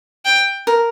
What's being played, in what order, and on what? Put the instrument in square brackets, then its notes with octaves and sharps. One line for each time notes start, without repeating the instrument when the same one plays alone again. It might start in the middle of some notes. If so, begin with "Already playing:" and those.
[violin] G5
[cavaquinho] A#4